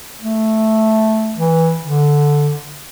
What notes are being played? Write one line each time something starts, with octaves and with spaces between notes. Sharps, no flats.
A3
E3
D3